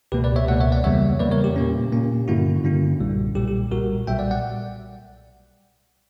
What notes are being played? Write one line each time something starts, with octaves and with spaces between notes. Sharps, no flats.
C#2 B2 A#3 G4 B4
B4 D5
C#5 E5
C#2 B2 A#3 D5 F#5
C#5 E5
D5 F#5
E2 C#3 G3 A#3 C#5 E5
E2 C#3 G3 A#3 B4 D5
A#4 C#5
G4
A#2 A#3 C#4
A#2 A#3 C#4
G2 D3 A#3 C#4 E4 F#4
G2 D3 A#3 C#4 E4
B1 A#2 G3
B1 A#2 G3 G4
G4
B1 A#2 G3 F#4 A#4
B1 A#2 G3 E5 G5
D5 F#5
D5 F#5